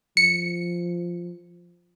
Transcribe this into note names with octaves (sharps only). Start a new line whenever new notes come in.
F3 C#7